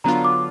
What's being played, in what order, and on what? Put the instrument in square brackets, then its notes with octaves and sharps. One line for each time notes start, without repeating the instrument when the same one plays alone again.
[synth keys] D3 F#3 B3 D4 F4 [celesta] A#5
[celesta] D6